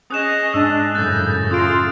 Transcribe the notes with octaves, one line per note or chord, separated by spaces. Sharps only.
C#4 G#4 D#5 D#6 F#6 E7
G#2 D4 G#5 E6
F#2 A2 C#3 F#6 G6 A6
C#4 F4 C6 D#6 G6 D7